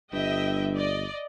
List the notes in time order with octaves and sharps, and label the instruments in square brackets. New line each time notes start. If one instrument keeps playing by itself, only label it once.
[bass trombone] G1 [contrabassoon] G2 [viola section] D#5 E5 G5
[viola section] D5 D#5